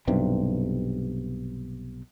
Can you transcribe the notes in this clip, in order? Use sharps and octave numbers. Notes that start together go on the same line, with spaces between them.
B1 G2 C3